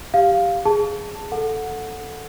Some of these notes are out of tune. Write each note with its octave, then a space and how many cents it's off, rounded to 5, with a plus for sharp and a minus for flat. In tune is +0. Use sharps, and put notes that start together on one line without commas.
G4 +0 F5 +0
G#4 +0 A5 +10
A4 +0 F#5 -15